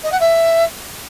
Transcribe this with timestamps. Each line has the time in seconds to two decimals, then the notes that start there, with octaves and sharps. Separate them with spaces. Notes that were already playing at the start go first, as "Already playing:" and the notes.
0.03 D#5
0.12 F#5
0.20 E5